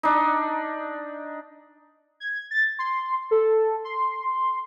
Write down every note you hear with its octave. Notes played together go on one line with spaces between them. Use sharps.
D4 D#4
G#6
A6
C6
A4
C6